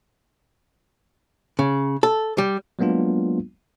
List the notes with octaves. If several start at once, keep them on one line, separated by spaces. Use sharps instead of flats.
C#3
A4
G3
F#3 G#3 A#3 B3 D4 F4